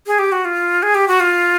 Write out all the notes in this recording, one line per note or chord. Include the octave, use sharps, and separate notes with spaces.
G#4
G4
F#4
F4
G#4
G4
F#4
F4